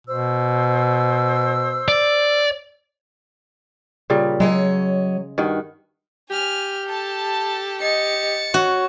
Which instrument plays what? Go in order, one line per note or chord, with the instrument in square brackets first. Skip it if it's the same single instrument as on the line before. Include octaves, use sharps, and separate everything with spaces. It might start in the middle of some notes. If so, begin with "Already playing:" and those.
[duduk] B2 [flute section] C5 E6
[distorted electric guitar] D5
[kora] A#2 C#3 G3
[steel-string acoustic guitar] F#3 C#5 D#5 [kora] G#3
[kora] G2 D#3 F#4
[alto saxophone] G4 [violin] G#5 F6
[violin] A4 A5
[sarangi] D#5 [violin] A6 C#7
[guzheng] F#4 [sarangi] C#5